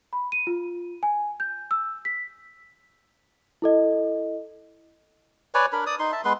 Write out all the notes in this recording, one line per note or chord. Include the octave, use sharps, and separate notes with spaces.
B5
D#7
F4
G#5
G6
E6
B6
E4 A4 D#5
B4 C#5 D5 G#5
D4 A#4 B5
D5 D#6
D#4 C6
E5 A5
G#3 B3 B4 C6